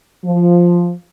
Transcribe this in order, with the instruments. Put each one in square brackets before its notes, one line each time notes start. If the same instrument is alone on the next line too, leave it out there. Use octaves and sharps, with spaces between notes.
[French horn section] F3